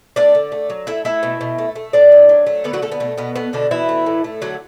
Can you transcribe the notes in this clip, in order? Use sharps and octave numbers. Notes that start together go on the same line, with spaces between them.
A3 D4 D5
D3
A3
F#3
A3 E4 E5
A3 E4 E5
B2
B2
A3
A3
A2 D4 D5
F#3
F#3
A3
D3 B3 B4
F#3 F#4
D3 A3 A4
B3
B2 A3
B2 B3
A3 B3
B2 D3 D4
B2 E3 E4
A3
A2
A3
D3 F#3 F#4